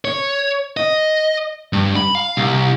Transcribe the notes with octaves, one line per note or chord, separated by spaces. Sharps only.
C#5
D#5
G2
B5
F5
C2